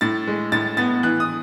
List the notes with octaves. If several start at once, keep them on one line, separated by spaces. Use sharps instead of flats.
A2 A6
G#3
A2 A6
B3 A6
E3 F#6
D#6